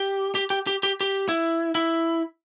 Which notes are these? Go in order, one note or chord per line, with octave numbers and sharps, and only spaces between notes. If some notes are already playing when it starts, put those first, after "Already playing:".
Already playing: G4
G4
G4
G4
G4
G4
E4
E4